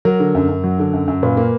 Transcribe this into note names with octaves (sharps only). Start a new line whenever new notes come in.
F#3 A#4
D3
F#2
F#2
F#3
D3
F#2
F#2
A#2 B4
A#3